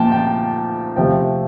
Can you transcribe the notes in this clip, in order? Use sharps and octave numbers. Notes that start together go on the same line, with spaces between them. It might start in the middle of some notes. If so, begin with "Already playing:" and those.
Already playing: A#2 F3 A3 G5 A5
G5
C3 F3 A3 G5